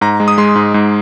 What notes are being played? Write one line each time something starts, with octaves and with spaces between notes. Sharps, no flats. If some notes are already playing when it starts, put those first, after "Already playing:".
G#2 A#5
G#3
D#6
G#3 C6
G#2
G#2